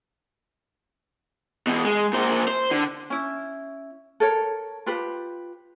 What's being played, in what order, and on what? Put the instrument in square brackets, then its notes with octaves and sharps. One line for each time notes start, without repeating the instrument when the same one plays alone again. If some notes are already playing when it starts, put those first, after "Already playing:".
[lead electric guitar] E2 B2
G#3
A#2 C5
C5
D3
[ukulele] C#4 E4
A4 A#4 C#5
F4 G4 B4 C5